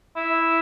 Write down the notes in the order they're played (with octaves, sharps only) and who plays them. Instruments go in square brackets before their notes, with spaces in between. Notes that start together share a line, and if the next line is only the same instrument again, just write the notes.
[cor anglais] E4